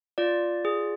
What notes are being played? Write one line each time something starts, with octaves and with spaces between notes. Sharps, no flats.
F4 D5
G#4